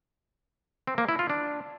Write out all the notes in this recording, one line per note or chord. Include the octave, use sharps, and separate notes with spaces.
C4
A#3
E4
F4
D4